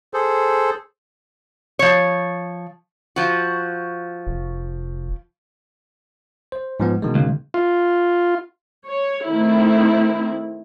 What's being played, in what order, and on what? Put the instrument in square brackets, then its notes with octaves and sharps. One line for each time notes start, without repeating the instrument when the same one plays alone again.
[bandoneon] G#4 A4 C5
[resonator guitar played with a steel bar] F3 C#5
F3 F#4
[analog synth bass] F1
[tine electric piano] C5
G#2 F3 B3
B2 D#3 G#3
[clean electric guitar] C#2
[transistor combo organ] F4
[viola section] C#5
D#3 A3 C4 E4